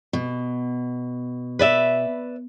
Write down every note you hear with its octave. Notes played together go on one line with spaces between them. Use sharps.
B2
B4 D5 E5